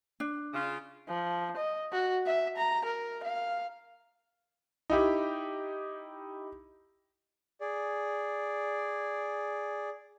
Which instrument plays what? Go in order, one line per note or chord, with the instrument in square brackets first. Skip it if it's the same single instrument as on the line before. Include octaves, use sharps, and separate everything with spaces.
[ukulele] D4
[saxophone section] C#3 F4
[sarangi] F3
D#5
F#4
E5
A#5
A#4
F5
[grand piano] D#4 E4 G4
[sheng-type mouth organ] G#4 D5